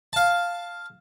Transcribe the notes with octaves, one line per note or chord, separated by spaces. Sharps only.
F5 A5